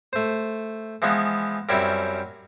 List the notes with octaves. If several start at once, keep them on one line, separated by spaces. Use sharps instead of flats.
A3 C5
E3 F3 G#3 B3
F#2 G3 C4 C#4 E4